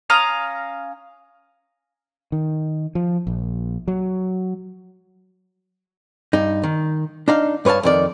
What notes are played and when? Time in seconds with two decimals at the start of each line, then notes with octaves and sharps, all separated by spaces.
0.10 C#4 F5 A#5 D#6
2.32 D#3
2.95 F3
3.27 A#1
3.88 F#3
6.33 G2 D#4
6.63 D#3
7.28 D4 D#4 F5
7.65 G2 B4 C#5 F5 A5
7.83 F2 D#3 D5